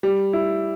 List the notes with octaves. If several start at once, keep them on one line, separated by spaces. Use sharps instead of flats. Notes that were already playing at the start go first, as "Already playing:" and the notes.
G3
E4